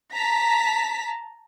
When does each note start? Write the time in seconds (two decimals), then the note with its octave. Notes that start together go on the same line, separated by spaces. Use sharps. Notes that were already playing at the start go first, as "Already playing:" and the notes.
0.16 A5 A#5 B6